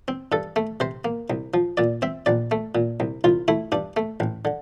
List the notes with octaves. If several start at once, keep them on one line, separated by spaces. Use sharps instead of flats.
C4
G2 A4
A3
C3 C5
A#3
C2
F3
A#2 D5
C4 E5
A#1 D5
A3
A#2
C2
C2 F4
A3 E4
G2 D4
A3
A1
D3